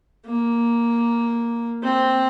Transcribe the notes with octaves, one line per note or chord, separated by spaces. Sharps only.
A#3
C4